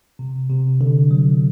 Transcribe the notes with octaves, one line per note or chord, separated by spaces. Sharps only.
C3
C3
D3
F#3